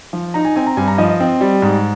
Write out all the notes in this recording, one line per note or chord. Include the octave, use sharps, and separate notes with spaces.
F3
D#4 A#5
G#5
C4 G#5
A#5
G2 G#5
A#5
F3 D#5
D#5
C4
G3
G#2